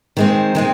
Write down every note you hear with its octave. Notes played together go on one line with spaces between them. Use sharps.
D#3 G#3 C4
D#3 G#3 C4